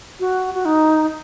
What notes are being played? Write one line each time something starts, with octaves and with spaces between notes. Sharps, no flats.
F#4
F#4
D#4